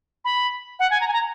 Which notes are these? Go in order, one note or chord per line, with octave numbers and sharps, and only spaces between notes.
B5
F#5
G#5
A#5
G#5
A#5